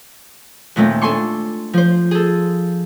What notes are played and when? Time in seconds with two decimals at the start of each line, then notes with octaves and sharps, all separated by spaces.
0.76 D#2 A#2 A3 C4
1.02 D4 A4 G#5 C6 C#6
1.73 F3 C5
2.11 G#4 A4